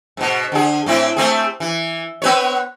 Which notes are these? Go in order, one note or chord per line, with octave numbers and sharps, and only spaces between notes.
G#2 B2
D3 G#4
A2 C4 E4
A3 C4 G#4
E3
B3 B4 C#5